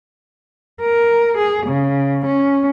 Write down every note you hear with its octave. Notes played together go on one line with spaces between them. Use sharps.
A#4
G#4
C#3
C#4